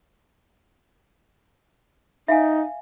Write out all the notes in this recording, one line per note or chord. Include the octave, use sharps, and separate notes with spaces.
D#4 E5 F5 G#5